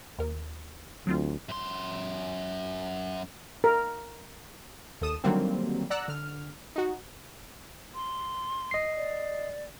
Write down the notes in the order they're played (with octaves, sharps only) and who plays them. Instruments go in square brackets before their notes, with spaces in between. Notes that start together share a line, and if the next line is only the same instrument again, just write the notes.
[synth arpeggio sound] D#2 A#4
[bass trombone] D2 [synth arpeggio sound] F#3 C4 F4
[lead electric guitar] F#2 C6
[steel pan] A#4
[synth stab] D#2 A4 D#6 E7
D3 D#3 F#3 G3 A#3 C4
D5 F#5 A#5 E6 F#6
D3 F6
D#4 F#4
[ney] C6
[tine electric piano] D#5 C7
[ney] D5